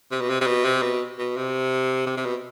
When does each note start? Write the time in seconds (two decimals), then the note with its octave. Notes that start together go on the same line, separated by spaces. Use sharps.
0.11 C3
0.21 B2
0.30 C3
0.41 C3
0.47 B2
0.64 C3
0.82 B2
1.19 B2
1.37 C3
2.06 C3
2.17 C3
2.25 B2